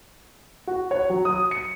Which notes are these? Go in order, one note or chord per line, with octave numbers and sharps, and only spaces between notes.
F#4
C#5
F#3
D#6
C#7